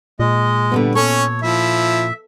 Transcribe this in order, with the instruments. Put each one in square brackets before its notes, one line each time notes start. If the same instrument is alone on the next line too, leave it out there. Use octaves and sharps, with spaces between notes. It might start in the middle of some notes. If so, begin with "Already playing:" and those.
[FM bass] A#2 [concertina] G#3 D#5
[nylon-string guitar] D3 G3 B3
[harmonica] C#4 C#6 [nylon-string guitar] A4 [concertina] C#5
[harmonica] F3 E4 [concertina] E5